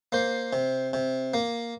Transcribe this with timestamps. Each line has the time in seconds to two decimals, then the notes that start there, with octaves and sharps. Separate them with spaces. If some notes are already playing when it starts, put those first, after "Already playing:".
0.12 A#3 C5
0.53 C3
0.93 C3
1.34 A#3